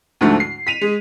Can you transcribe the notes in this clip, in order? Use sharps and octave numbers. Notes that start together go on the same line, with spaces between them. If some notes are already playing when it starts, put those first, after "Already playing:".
D2 G#2 D3 F3 A3
C7
B6 D#7 F7
G#3